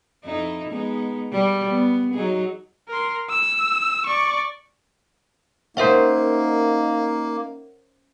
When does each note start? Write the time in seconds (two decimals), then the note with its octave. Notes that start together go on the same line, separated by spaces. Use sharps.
0.24 F2 D#4 E4
0.70 G#3 B3 D#4
1.33 G3
1.71 B3
2.14 F#3 D#4 G#4
2.88 A#4 C6
3.29 E6
4.06 D5 C#6
5.77 A#3 C#4 D#4 A#4 C5 E5 F#5